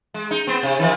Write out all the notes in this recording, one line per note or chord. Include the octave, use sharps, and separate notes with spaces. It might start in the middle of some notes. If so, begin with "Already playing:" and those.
G#3
D#4
B3 C4
C3
D#3 F3